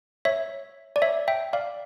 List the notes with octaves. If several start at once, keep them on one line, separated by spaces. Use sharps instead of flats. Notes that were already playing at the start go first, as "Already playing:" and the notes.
C#5 E5
D5
C#5 E5
E5 G5
D5 F5